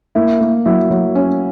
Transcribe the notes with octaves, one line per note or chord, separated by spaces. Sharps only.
A#3 E4
A#3
F#3 E4
F#3
C#4